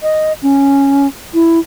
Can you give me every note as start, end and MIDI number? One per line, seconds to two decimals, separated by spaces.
0.03 0.33 75
0.42 1.07 61
1.34 1.59 64